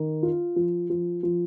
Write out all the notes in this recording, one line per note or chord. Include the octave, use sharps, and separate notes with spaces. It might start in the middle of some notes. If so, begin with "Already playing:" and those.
Already playing: D#3
F4
F3
F3
F3